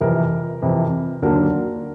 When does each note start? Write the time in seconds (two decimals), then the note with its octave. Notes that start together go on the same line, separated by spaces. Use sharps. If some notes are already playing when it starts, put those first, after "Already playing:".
0.01 F2 C3 E3 A#4
0.62 F2 C3 E3
1.22 D#2 D3 F#3 A#3 D4 A#4